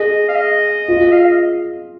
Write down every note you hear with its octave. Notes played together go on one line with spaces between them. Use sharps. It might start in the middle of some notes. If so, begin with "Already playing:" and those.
Already playing: G#4 D#5
F5
D#5
F4
F5
D#5